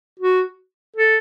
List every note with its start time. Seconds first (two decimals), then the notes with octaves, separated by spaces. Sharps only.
0.20 F#4
0.96 A4